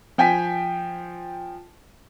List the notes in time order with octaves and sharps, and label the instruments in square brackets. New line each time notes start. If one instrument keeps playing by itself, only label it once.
[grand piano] F3 G5 G#5 B6